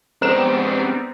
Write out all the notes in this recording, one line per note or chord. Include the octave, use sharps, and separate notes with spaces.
G3 G#3 B3 C4 D4 C5 A#5 E7